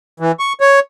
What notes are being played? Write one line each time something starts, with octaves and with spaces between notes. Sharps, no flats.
E3
C#6
C#5